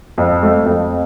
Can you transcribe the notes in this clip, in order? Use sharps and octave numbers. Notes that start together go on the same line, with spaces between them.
F2
A3
F2